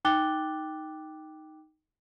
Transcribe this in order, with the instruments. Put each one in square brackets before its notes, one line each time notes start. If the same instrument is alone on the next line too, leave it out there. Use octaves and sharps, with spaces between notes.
[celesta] D#4 G5 D6 F#6 A6 G7